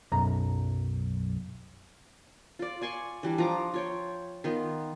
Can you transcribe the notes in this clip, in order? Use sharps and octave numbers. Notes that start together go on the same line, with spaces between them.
B1 F#2 A#5
F4 D5
D5 G#5 C6 C#6
E3 G3 D4
F3 A#5 D6
F4 C#5 G5
D#3 B3 F4